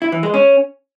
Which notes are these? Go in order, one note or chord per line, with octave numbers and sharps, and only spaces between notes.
E4
E3
G#3
C#4